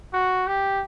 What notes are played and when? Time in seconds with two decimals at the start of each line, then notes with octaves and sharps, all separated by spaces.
0.13 F#4
0.47 G4